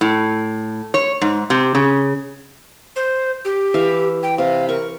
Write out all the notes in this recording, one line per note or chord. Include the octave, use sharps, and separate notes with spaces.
A2
C#5
G#2
C3
C#3
C5
G4
E3 E5 F5
G5
C3 F5
A#4 C#6